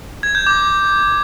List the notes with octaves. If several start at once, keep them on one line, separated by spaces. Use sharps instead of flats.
G#6
G6
D6